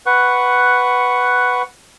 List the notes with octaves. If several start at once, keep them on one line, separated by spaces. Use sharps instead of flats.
B4 F#5 C#6